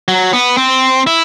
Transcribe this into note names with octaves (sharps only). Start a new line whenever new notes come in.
F#3
B3
C4
E4